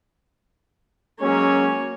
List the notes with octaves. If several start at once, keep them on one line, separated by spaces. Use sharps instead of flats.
F#3 G#3 A#3 C#4 C#5